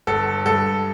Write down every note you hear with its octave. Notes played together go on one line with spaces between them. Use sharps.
G1 A4
G2 A4